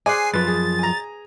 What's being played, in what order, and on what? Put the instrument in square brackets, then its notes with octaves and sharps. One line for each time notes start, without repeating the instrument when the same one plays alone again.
[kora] G#4 C5 F#5 [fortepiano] D5 [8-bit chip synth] G#5 C7
[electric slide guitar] F#2 F3 [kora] B4 [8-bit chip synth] A6
[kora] G#4
[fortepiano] G#5 A#5